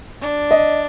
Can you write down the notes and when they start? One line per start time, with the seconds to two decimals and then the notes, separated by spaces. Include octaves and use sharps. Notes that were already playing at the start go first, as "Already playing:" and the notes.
0.22 D4
0.51 D#5